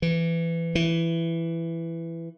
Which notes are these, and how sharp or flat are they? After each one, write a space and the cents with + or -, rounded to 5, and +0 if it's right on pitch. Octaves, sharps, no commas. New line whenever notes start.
E3 +20
E3 +10